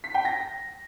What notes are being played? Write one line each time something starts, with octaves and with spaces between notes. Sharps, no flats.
B6
G5
A#6